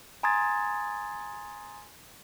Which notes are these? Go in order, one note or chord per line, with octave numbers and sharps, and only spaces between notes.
G#5 A#5 C6 D#6 G#6 A6